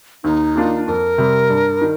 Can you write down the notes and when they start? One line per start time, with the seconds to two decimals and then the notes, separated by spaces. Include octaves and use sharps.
0.24 D#2 D#4
0.56 D#3 A#3 D4 F4
0.87 F2 A#4
1.18 C3 G3
1.50 G2
1.81 D#3